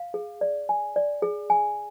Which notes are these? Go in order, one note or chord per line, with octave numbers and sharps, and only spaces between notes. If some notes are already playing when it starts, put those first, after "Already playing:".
Already playing: F5
G#4
D5
G#5
D5
G#4
G#5